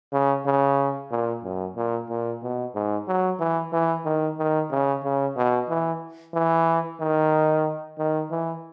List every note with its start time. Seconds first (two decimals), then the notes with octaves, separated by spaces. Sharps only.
0.13 C#3
0.46 C#3
1.11 A#2
1.44 F#2
1.76 A#2
2.10 A#2
2.42 B2
2.75 G#2
3.08 F#3
3.40 E3
3.73 E3
4.05 D#3
4.38 D#3
4.71 C#3
5.04 C#3
5.36 B2
5.69 E3
6.34 E3
7.00 D#3
7.99 D#3
8.31 E3